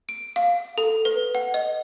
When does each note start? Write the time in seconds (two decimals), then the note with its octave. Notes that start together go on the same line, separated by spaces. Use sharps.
0.09 D7
0.36 F5
0.78 A4
1.05 B4
1.35 F#5
1.54 D#5